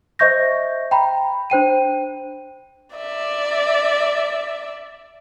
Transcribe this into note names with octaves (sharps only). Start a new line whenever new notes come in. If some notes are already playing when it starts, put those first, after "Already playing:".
C5 D#5 E5 C#6 G6 A#6
G5 A#5 B5
D4 C5 G5 D#7
D5 E5